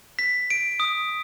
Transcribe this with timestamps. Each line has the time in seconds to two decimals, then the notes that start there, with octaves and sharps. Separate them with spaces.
0.19 B6
0.50 D7
0.80 D#6